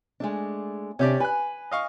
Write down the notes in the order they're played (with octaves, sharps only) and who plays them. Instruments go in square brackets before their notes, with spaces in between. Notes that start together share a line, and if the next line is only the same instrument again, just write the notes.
[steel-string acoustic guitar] G#3 A3 D4
[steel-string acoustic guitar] C3 D4 [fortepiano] C#4 G4 D5
[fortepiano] B4 F#6 [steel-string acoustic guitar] G#5
[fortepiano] D#5 F5 C#6